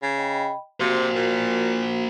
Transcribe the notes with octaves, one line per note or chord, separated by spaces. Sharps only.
C#3
D#5 G5 B5
C3 A#3 F#4 C5 F5
A#2